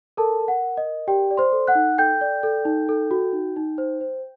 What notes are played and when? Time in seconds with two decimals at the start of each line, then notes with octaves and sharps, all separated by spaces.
0.17 A4 A#4 A5
0.41 A#4
0.48 F#5
0.62 A#4
0.77 D#5
0.85 A#4
1.08 G4 D5 G5
1.31 D5
1.37 C5 C6
1.52 A4
1.67 F#5 F#6
1.75 D#4
1.98 A4 G5 G6
2.21 D5
2.43 A4
2.65 D#4
2.89 A4
3.11 F#4
3.33 D#4
3.56 D#4
3.78 C5
4.01 C5